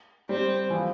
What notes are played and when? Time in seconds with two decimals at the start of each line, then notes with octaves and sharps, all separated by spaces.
0.29 G3 C4
0.70 E3
0.73 F3